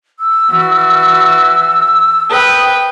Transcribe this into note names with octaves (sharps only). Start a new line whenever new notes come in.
E6
E3 F#4
B4 G5 D#6